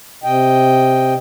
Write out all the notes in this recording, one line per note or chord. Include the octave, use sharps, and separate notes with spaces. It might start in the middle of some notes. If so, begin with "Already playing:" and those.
C3 D#5 G5